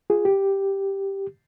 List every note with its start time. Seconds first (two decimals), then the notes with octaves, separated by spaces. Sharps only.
0.10 F4 G#4
0.25 G4